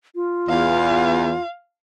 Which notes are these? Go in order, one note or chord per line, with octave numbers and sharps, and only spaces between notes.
F4
E2 F5